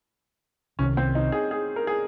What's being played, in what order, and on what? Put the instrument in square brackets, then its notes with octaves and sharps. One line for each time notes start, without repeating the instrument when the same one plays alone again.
[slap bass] C2 C3 D#3 [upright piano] C#4
[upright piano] C4
D#4
G#4
G#4
A#4
G#4